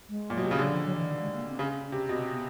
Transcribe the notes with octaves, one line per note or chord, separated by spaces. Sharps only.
G#3
A#2
B2 F#3
C3
C#3
D3 F#3
F3
F#3
E3
D#3
G#3
A#3
C4
C#3 C#4
C#4
C3
B2 C4
B3